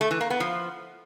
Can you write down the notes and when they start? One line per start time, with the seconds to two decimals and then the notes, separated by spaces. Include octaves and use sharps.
0.01 A3
0.11 E3
0.21 A#3
0.30 B3
0.40 F3